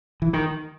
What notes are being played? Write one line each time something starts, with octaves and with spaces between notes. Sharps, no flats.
E3
D#3